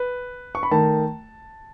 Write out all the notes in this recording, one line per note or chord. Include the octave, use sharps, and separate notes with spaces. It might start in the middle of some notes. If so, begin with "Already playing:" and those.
Already playing: B4
C#6
B5
D#3 A3 A5